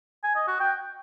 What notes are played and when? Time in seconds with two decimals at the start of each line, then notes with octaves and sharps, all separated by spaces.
0.24 G#5
0.36 D#5
0.48 F#4
0.60 G5